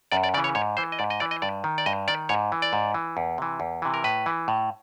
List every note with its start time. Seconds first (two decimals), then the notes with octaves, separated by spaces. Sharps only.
0.12 F#2 D5
0.23 D5
0.34 C#3 D5
0.37 E3
0.44 C#5
0.55 G#2 C#5
0.77 E3 C5
0.92 D#5
0.99 G#2 D5
1.10 D#5
1.20 E3 D5
1.31 D#5
1.42 G2 D5
1.64 D#3
1.78 D5
1.86 G2 D#5
2.08 D#3 D5
2.29 G#2 C#5
2.52 E3
2.62 D5
2.73 G#2
2.94 E3
3.17 E2
3.38 C3 E3
3.60 E2
3.82 C3 E3
3.94 A#4
4.04 A2 B4
4.26 E3
4.48 A2